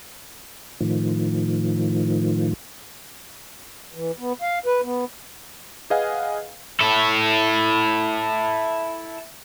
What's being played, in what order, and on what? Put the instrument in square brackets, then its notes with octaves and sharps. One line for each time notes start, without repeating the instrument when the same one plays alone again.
[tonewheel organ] A2 D#3 F3
[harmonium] E3
B3
F5
B4
B3
[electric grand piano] G#4 B4 D#5 F5 F#5 G#5
[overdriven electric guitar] E4 A4